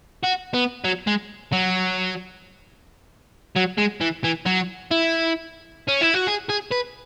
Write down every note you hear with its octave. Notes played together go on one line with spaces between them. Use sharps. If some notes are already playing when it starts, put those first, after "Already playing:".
F#4
B3
F#3
G#3
F#3
F#3
G#3
E3
E3
F#3
E4
C#4
E4
F#4
G#4
G#4
B4